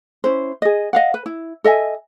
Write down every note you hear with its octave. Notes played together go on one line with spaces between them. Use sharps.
C#4 E4 C5
G#4 D#5
D#5 F5 F#5
B4
E4
A4 D#5 E5 G#5